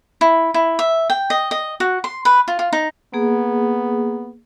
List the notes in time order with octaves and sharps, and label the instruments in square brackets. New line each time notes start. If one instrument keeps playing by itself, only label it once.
[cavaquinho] E4
E4
E5
G5
D#5
D#5
F#4
C6
B4
F4
F4
D#4
[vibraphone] A#3 G#4 [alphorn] B3